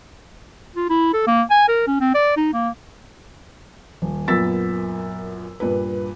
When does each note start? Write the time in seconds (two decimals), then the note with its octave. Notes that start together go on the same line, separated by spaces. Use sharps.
0.76 F4
0.90 E4
1.13 A4
1.27 A#3
1.50 G#5
1.68 A#4
1.87 C#4
2.01 C4
2.15 D5
2.37 D#4
2.53 A#3
4.02 D#1
4.28 F#2 A#2 B3 E6 A6 B6
5.60 G2 A#2 B4